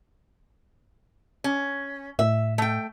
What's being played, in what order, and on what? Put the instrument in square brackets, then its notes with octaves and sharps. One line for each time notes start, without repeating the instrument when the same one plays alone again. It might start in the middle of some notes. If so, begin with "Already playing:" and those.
[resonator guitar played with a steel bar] C#4
[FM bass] A2 [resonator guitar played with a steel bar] E5
[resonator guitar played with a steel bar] A3 G5